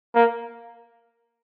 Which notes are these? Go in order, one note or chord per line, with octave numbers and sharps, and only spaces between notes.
A#3